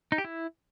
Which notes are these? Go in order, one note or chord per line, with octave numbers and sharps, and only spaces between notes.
D#4
G4
E4